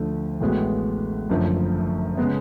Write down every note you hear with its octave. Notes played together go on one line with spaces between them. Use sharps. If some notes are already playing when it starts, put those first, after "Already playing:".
Already playing: D2 D3 F3 A3
A1 A2 G#3 B3 F#4
F#1 F#2 D3 F3 A3
C#3 G#3 B3